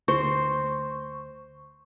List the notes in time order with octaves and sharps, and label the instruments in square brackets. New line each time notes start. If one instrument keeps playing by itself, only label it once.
[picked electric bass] D2 [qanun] C5 [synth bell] C#6